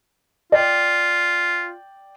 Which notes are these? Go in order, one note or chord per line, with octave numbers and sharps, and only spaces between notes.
F4 D5 G5